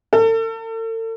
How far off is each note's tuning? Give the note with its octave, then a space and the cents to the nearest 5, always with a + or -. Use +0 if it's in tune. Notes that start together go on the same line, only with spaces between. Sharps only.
A4 +40